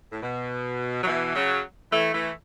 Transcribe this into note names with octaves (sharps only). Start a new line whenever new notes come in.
A2
B2
F#3
B2 E3
C#3 F#3
E3 A3
E3 A3